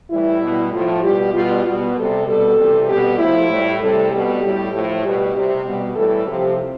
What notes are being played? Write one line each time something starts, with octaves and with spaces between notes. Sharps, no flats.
A2 E3 G3 E4
B2 G3
A2 F3 F4
B2 G3 G4
B2 G3 F4
B2 G3
C3 G3 A4
B2 G3 A4
C3 E3 G3
B2 G3 G4
A2 F3 E4
A2 G3
C3 G3 A4
B2 G3 G4
A2 G3
A2 F3
B2 G3 G4
C3 G3
B2 G3
A2 E3 G3 A4
C3 F3 G4